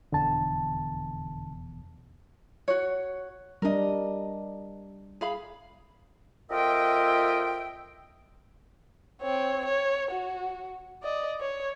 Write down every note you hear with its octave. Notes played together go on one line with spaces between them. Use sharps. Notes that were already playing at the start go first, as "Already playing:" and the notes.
F1 E2 B2 D3 A5
F#4 C#5
G3 D4 A#4 D#5
G#4 F5 B5
F2 F4 A#4 D#5 E5 G5
C4 C#5
C#5
F#4
D5 D#5
C#5